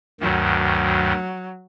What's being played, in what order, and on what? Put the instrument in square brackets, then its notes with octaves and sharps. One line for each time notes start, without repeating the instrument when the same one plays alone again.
[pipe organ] D2 G2 D#3 [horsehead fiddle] F#3